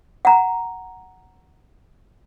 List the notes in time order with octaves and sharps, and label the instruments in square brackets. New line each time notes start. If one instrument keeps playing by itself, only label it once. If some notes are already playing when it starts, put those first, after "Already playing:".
[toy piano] F#5 A#5